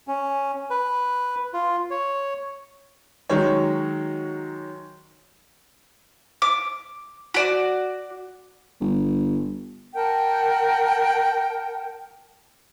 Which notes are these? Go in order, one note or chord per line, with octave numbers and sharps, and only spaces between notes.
C#4
B4
F4
C#5
D#3 F#3 G#3 C#4 C#5
D6
F#4 D5
G1
A#4 F#5 G5 A5